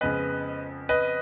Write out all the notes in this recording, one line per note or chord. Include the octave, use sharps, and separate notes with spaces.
F2 C#3 G#3 B3 B4 D#5
B4 D#5